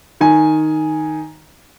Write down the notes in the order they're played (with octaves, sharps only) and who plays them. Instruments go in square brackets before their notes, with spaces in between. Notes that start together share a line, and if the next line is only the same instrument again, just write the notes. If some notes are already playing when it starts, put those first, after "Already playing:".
[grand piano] D#3 G#5